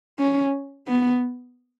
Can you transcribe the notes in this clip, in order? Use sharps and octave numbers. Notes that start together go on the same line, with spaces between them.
C#4
B3